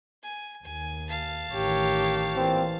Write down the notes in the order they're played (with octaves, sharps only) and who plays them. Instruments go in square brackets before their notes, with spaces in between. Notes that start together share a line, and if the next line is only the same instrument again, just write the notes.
[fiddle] G#5
[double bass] D#2 [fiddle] G#5
[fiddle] F5 A5
[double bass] A1 D#3 [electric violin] G4 C#5
[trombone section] A#2 C4 [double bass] E3